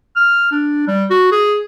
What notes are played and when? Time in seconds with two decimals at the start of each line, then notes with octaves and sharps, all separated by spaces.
0.16 F6
0.52 D4
0.87 G3
1.10 F#4
1.32 G#4